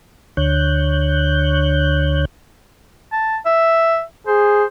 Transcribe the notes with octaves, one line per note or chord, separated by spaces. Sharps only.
D2 D3 C#5 F#6 G6
A5
E5
G#4 C5